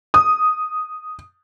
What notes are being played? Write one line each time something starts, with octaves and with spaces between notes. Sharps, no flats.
D#6